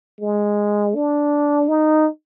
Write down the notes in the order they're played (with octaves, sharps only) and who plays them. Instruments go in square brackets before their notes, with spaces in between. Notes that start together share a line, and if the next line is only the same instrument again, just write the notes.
[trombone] G#3
D4
D#4